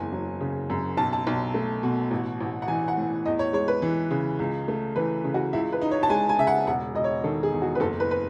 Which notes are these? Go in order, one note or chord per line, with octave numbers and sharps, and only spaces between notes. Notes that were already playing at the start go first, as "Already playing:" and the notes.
Already playing: F#1 E2 G#5
F#3
C#3
F#2
B1 A5
A5
B1
A3
B2
A1
A1
F#5
E3 G#5
F#5
A2
E2 D#5
C#5
G#3 C#5
B4
E3
C#3
C#2
A3
E3 B4
C#3
F#4
C#2 E4
B4
D#4
C#5
A5
G#3 G#5
G#5
C#3 E5
F#5
E1 F#5
E1 D#5
C#5
D#3 A4
G#4
E2
F#4
B4
F#1 A4
B4
B4